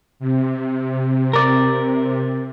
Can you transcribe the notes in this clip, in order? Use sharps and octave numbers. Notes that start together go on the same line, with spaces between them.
C3
A#4 D5